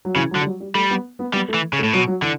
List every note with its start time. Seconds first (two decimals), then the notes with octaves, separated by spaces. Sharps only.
0.05 F#3
0.16 C#3 E3
0.31 F#3
0.35 D3
0.41 G3
0.46 F#3
0.60 G3
0.75 G3 A3
0.91 B3
1.19 B3
1.33 G3 B3
1.48 A3
1.54 E3
1.73 C#3
1.79 A3
1.84 A2
1.93 B2 F#3
2.08 F#3
2.22 D3 E3